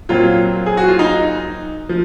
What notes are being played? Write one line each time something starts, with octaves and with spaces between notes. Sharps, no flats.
A#2 F#3 C4 F4
G#4
F#4
F4
D#4
F3